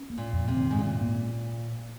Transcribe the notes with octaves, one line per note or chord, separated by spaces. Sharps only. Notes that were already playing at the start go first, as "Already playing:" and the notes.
Already playing: C#4
A#3
A#2
F2
C3
D#3
G#2
A#2 C#4
A#3